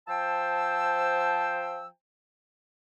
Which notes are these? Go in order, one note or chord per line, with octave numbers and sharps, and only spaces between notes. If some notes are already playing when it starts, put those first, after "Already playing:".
F3 C5 G5 A5 E6